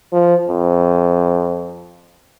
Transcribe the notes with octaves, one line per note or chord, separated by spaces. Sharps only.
F3
F2